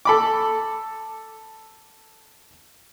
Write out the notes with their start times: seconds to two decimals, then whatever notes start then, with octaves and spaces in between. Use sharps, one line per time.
0.05 A4 B5 D6